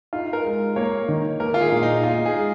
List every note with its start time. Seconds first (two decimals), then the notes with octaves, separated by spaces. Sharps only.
0.13 D#4 F4
0.33 A#4
0.44 G#3
0.76 A#3 C#5
1.08 D#3
1.40 A#3 A#4
1.54 F4
1.61 G#4
1.72 A#2
1.83 D#4
2.04 D#4 F4
2.26 G#4
2.36 G#3